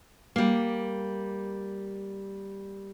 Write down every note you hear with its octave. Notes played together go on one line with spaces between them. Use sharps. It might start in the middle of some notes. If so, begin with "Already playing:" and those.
G3 A#3